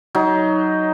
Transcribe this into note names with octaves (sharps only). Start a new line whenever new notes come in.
F#3 D#4